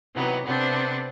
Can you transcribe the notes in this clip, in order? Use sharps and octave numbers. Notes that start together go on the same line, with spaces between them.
C3 E3 F#3 B3 D#4
C3 B3 C4 D4 A4